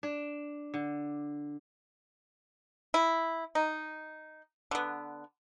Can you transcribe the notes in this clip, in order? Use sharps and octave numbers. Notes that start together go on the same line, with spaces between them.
D4
D3
E4
D#4
D3 B3